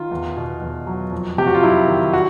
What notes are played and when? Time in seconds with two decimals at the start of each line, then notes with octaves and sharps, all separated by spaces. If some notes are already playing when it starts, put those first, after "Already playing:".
Already playing: D#3 F4
0.11 E2
0.37 B2
0.62 E2
0.87 F#3
1.12 F2
1.38 C3 G4
1.47 F#4
1.55 F4
1.62 F#3 E4
1.88 D#3
2.13 F#4